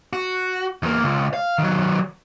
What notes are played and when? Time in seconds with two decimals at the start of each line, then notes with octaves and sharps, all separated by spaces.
0.13 F#4
0.83 E2 A#3
1.03 C#2
1.34 F5
1.58 D#3 F#3